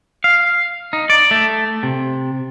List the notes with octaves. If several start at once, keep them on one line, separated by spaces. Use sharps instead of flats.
F5
D#4
D5
A3
C3